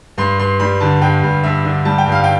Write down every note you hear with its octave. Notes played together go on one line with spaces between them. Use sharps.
G2 C6
G2 C6
G3 B5
D3 A5
G2 G5
G2
G2 E5
D3
G3 A5
G5
G2
F5
G5